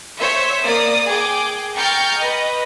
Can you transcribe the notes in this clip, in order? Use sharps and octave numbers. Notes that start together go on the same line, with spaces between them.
C5 C#5 E5
A#3 D5 D#6
G#4 G5 D6
G5 A#5 C#6 F6 G6 A6
B4 D#5